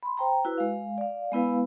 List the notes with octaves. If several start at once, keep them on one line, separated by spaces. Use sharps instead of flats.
B5 C6
C5 G5 A#5
E4 F#4 B4
G#3 F5
D5 F5
G#3 B3 E4 B4 F5